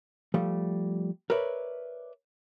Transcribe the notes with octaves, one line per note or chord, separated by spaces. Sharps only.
F3 G3 A3
A#4 B4 C#5 D5 E5